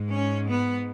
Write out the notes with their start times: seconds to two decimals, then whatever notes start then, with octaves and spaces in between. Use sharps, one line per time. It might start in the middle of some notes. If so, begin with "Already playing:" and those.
Already playing: G#2
0.13 C#4
0.49 B3